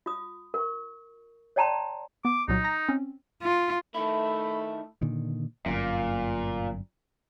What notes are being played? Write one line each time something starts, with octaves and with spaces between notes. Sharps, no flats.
F4 D#6
A#4 C#6
C#5 D5 G5 A5 A#5 C6
B3 D6
C2 A#2 F#3 D#4
A#5 A#6
C4 C#4
F4
D#3 A3 E4 B5
A#2 D3 D#3
G1 F#2 A#2